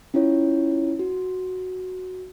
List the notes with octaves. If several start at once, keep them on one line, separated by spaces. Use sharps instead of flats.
C#4 E4 F4 C#5
F#4